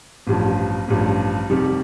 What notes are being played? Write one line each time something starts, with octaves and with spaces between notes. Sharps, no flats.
A1 G2 F3
A1 G2 F3
F1 F2 D#3 G3